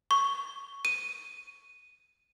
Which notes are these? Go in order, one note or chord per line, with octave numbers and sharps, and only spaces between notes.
C#6
D#7